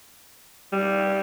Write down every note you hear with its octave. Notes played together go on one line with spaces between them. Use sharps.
G3